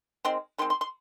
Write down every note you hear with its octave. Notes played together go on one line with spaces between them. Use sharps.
D#3 G#3 C4 C6
D#3 G#3 C4 C6
C6
C6